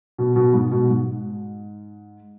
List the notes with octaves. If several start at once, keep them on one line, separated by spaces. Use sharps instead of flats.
B2
B2
G#2
B2
G#2